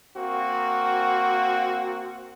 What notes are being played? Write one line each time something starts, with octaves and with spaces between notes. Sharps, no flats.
A#3 C4 F#4